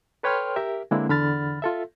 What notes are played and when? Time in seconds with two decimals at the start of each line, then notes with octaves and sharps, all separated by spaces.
0.23 A4 B4 C#5 G5 C6 F6
0.56 G4 A#4 E5
0.91 D3 G#3 A#3 C4 D4 E4
1.09 E2 D3 B5 F6 A6
1.62 F4 A4 E5